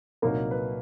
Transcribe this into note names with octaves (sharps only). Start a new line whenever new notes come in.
C2 A#2 F#3 A#3 D#4 A#4
B4